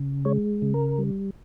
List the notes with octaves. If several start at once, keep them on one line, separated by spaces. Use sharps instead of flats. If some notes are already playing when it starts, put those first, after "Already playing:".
Already playing: C#3
G#3 C#5
C#3
A#4
G3